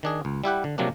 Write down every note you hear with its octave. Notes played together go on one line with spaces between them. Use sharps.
D#3 D4 G#4
C#2
G3 E4 G4 F#5
D3
C3 F3 F#3 A#3 C4 D4